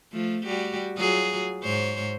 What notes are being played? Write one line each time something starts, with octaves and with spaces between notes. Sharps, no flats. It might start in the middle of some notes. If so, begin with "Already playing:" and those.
F3 A3
G3 F#4 G4
F#3 F4 G#4
G#2 C5 C#5